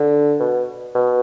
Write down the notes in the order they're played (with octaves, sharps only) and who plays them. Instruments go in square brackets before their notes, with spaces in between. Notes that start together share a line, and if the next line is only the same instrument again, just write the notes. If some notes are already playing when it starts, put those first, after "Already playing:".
Already playing: [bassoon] D3
B2
B2